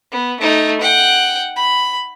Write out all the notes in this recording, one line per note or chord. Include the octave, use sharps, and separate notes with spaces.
B3
A3 D#4
F#5 G5
B5